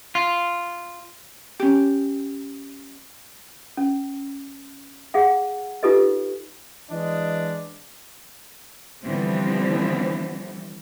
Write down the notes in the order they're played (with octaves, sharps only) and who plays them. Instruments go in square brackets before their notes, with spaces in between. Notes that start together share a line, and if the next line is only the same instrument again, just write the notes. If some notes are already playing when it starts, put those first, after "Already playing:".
[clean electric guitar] F4
[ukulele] C#4 G4
[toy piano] C#4
G#4 F5 F#5
D#4 F4 G4 A4 B4 D#5
[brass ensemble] E3 G#3 D4 D#5
[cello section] D3 E3 F3 G3 B3 C4